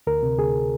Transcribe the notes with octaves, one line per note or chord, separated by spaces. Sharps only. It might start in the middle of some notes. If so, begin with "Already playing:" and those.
D2 A#4
C3
D2 G#4